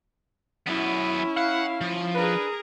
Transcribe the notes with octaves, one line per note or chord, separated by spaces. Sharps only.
F#2 B3 C#4 E4
F5 F#5
F3
D4 G#4 A#4 B4